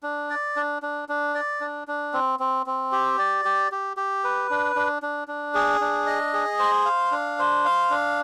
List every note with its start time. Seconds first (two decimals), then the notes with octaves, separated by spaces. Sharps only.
0.03 D4
0.30 D5
0.56 D4
0.82 D4
1.09 D4
1.35 D5
1.61 D4
1.88 D4
2.14 C4
2.40 C4
2.66 C4
2.92 G4
3.19 D5
3.45 G4
3.72 G4
3.97 G4
4.24 B4
4.50 D4
4.76 D4
5.02 D4
5.28 D4
5.54 G#4
5.81 D4
6.07 D#5
6.34 G#4
6.59 C5
6.85 F5
7.12 D4
7.39 C5
7.65 F5
7.91 D4